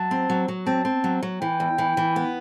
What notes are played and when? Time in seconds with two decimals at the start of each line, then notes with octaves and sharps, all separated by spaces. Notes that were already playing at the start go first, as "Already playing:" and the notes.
Already playing: F#3 A5
0.11 C4
0.30 F#3
0.48 F#3
0.67 C4 A5
0.85 C4
1.04 F#3
1.23 F#3
1.41 E3 G5
1.60 E2
1.78 E3
1.97 E3
2.16 B3